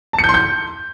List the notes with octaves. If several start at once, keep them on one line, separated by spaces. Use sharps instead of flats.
A5
C#7
G6
C6
G6